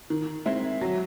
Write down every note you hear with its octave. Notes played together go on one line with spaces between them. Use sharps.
D#3
G#3 C4 E4
F#3